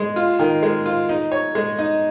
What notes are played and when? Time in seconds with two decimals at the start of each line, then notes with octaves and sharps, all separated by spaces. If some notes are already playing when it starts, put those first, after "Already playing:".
Already playing: G#3
0.16 F4
0.39 D#3
0.63 G#3
0.86 F4
1.09 D#4
1.32 C#5
1.55 G#3
1.79 D#4